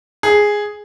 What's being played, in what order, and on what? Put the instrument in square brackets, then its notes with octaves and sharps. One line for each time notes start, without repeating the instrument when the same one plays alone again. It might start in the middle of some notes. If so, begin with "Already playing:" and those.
[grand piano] G#4